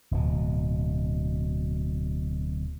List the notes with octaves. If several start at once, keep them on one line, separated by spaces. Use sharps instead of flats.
D1 B2